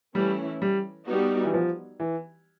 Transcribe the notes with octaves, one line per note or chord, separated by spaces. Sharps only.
E3 G3 A3 C#4 E4
G3
G3 B3 D#4 F#4
E3
F3
E3